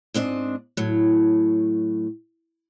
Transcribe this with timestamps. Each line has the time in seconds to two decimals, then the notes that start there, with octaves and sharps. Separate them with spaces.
0.14 G#2 C4 D4 D#5
0.77 A2 F#3